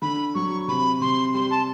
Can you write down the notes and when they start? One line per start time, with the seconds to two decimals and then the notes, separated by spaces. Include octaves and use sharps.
0.02 D3 B5
0.35 F#3 C#6
0.68 C3 B5
1.01 C3 C6
1.34 G3 C6
1.51 A5